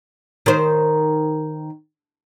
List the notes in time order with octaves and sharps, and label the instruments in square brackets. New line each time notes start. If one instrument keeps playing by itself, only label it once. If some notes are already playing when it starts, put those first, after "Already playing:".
[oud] D#3 C5